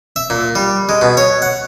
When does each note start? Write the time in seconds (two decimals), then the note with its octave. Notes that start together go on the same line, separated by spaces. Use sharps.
0.16 E5
0.30 A#2
0.55 G3
0.89 G#3
1.01 B2
1.17 C#5
1.42 F#5